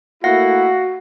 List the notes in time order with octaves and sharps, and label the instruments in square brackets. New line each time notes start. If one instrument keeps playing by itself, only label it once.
[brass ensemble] A3 A#3 E4 [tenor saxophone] F#4 [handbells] F5 F#5 A#6